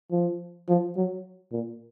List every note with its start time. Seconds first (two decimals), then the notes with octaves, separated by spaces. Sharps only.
0.11 F3
0.69 F3
0.97 F#3
1.52 A#2